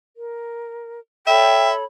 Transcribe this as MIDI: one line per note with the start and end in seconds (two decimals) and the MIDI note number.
0.16 0.99 70
1.27 1.83 69
1.27 1.83 73
1.27 1.73 76
1.27 1.68 79
1.27 1.83 83